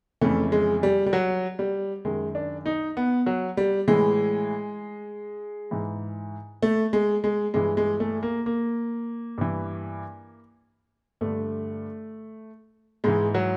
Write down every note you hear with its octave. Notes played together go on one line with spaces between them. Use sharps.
F2 C#3 E3 A3
G#3
G3
G3
F#3
G3
F#2 D#3 G#3
D4
D#4
B3
F#3
G3
A2 E3 G#3
G#2 E3
A3
G#3
G#3
G2 E3 G#3
G#3
A3
A#3
A#3
G2 E3
G2 D3 A3
G#2 E3 G#3
F#3